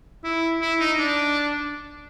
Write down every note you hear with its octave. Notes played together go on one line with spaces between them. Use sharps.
E4
E4
D#4
D4